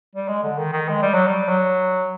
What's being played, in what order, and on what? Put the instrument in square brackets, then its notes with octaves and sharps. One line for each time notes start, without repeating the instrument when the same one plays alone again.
[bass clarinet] G3
G#3
D3
D#3
D#3
G#3
G3
F#3
G3
F#3